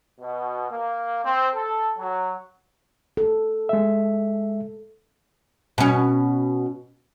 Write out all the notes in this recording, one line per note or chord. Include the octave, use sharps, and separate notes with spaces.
B2
A#3
C4
A4
F#3
A4
G#3 E5
B2 C#4